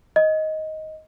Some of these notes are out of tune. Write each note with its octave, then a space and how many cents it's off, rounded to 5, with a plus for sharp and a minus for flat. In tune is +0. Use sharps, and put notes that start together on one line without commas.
D#5 +10